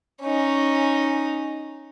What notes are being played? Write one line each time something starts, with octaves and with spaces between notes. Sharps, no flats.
C#4 D#4